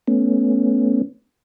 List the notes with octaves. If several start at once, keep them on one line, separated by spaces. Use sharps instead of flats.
A3 B3 C#4